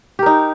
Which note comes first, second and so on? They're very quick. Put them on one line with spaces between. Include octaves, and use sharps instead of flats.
G4 A#4 D#4